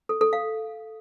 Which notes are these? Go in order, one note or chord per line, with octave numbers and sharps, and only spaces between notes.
A4
A4
F5